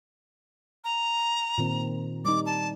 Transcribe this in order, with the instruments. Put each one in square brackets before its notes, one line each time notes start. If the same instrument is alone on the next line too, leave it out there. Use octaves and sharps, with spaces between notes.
[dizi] A#5
[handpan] A#2 D#3 C4
[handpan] G3 D#4 [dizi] D6
[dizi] A5